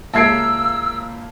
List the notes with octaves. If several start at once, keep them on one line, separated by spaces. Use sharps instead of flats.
C#2 A#3 E5 A5 E6 G#6 C7 D7